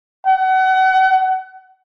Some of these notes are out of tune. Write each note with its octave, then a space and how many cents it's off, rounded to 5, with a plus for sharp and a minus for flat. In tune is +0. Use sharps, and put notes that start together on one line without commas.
F#5 +30